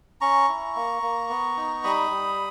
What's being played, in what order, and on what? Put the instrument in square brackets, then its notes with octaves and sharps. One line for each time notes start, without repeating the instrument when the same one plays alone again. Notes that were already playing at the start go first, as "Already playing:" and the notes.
[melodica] C#4 A#5 C#6
E4
A#3
A#3
B3
D#4
G3 B5 D#6
G3